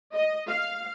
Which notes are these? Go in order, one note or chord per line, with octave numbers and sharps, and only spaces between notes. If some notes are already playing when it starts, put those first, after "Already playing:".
D#5
F5